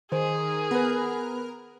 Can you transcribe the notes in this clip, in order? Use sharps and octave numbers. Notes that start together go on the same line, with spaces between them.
D#3 G#4 C5
B3 A#4 B4